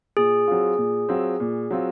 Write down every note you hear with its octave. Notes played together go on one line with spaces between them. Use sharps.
A#2 G#4
F#3 C4 F4
A#2
F#3 C4 F4
A#2
F#3 C4 F4